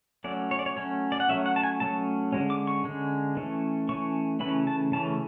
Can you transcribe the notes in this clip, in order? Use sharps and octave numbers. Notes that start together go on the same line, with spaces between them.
F#3 A3 C#4 D5
C#5
D5
C#5
F#3 A3 C#4 C#5
D5
F#5
F#3 A3 C#4 E5
F#5
A5
G#5
F#3 A3 C#4 A5
D3 G#3 C#4
D6
C#6
D3 G#3 C#4
E3 A3 C#4
E3 A3 C#4 C#6
C#3 E3 A3 C#4 B5
A5
C#3 E3 A3 C#4 A5